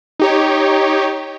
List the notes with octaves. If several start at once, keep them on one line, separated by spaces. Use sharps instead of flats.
D#4 G4 C#5